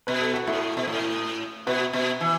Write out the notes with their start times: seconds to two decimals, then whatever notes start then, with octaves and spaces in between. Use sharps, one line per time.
0.07 B2 B4
0.21 A4
0.34 F#4
0.46 A2 E4 A4
0.77 B2
0.87 A2
1.67 B2 F#4 B4
1.93 B2
2.21 E3